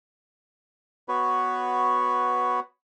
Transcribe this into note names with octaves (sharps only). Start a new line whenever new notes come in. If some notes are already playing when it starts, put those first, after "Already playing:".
B3 F#4 B4 C#5